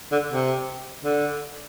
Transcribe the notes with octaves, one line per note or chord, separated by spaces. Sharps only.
D3
C3
D3